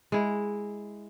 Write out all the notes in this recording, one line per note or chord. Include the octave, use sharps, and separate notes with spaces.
G#3 E4